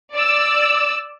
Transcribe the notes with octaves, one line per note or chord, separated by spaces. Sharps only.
D5 E6